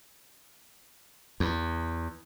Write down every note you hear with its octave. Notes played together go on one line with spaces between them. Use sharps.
E2